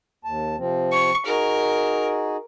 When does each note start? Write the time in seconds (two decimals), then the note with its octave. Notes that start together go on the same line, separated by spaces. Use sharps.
0.24 D#2 A5
0.58 C3 F3 C4
0.92 C#6
1.26 D#4 F#4 G#4 A#4